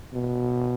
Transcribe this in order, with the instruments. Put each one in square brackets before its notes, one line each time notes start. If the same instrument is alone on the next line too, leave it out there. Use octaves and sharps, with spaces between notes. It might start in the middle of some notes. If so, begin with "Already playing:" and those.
[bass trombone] B2